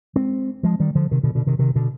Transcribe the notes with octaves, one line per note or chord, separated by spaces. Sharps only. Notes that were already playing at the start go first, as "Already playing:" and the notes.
G#3 C4
F3 G#3
D#3 G3
D3 F3
C3 D#3
B2 D3
B2 D3
C3 D#3
C3 D#3
B2 D3